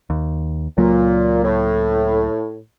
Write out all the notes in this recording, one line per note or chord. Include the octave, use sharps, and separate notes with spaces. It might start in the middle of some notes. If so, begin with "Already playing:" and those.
D#2
C#2 A#2 F#3 A#3
A2